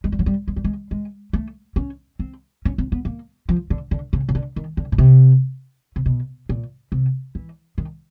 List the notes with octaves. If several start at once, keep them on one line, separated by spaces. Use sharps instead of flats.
G#3
G3
F#3
G3
G#3
G3
G#3
G#3
A3
C#4
C4
C#4
C4
B3
A#3
F3
D3
D3
C#3
C#3
D3
D#3
D3
B2
C3
C3
B2
A#2
C3
E3
D#3